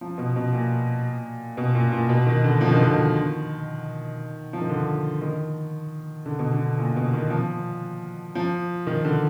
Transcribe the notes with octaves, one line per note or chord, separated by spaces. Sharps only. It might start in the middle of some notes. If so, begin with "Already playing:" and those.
F3
B2
B2
A#2
B2
A#2
A#2
B2
D#3
D3
F3
D#3
D3
D#3
F3
D#3
D3
D#3
D3
B2
D3
A#2
B2
D#3
F3
F3
D#3
D3